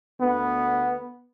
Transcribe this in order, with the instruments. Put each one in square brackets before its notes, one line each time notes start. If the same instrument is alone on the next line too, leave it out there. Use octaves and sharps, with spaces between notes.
[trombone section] D2 D3 B3